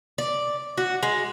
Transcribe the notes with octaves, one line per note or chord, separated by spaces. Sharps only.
D5
F#4
G#3